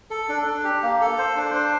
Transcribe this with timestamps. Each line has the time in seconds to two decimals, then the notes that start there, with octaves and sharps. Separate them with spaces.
0.11 A4
0.29 D4
0.46 D4
0.64 G4
0.83 A#3
1.01 A4
1.19 C5
1.37 D4
1.55 C5